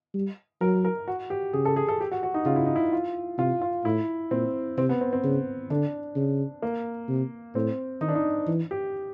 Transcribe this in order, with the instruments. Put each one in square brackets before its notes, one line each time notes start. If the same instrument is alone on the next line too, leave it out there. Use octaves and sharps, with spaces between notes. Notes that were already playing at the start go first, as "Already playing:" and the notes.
[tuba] G3
[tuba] F#3 [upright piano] A#4
[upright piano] A#4
F#4
G4
[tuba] C#3 [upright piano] G#4
[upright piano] A4
G#4
A4
G4
F#4
F#4
D#4
[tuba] C#3 [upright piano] F4
[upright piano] E4
D#4
E4
F4
[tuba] C3 [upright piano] F4
[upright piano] F4
[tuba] A2 [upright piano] E4
[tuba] A#2 [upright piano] C4
[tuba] C3 [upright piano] C4
[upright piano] B3
C4
C4
[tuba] C#3
[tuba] D3 [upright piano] D4
[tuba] C#3
[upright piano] A#3
[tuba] C3
[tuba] A2 [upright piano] C4
[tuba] D#3 [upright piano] D#4
[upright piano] D4
D#4
[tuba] E3
[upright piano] G4